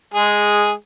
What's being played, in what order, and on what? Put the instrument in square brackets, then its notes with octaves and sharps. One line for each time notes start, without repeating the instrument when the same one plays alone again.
[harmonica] G#3 G#4